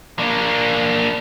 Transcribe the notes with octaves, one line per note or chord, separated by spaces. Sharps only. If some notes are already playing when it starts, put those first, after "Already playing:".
A#3 D4